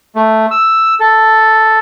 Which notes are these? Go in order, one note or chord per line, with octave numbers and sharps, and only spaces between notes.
A3
E6
A4